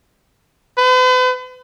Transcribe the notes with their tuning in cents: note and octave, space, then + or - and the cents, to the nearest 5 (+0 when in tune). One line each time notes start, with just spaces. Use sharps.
B4 +45